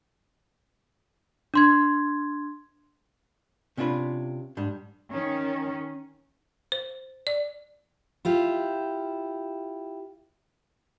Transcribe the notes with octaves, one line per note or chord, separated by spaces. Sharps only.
D4 C6 G#6
C3 C#4 D4 F4 B4
G#2 G3 D4
D#3 C#4
C5
D5
E4 F4 G4